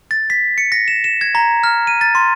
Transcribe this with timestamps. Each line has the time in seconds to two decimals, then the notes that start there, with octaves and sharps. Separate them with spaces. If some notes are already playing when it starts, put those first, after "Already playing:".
0.11 A6
0.30 B6
0.58 C#7
0.72 A#6
0.88 E7
1.04 E7
1.21 G#6
1.35 A#5
1.64 F6
1.87 D#7
2.01 A6
2.15 C6